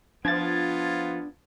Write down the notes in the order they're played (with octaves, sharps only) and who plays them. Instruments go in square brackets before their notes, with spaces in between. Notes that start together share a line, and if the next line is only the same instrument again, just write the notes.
[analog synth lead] F3 [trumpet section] B3 F4 [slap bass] D4 [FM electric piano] G#6 A6